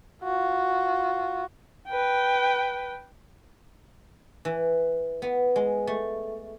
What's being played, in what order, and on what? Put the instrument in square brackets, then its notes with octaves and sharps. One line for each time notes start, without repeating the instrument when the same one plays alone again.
[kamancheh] F4 F#4
B4 G5
[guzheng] E3
B3
G#3
A3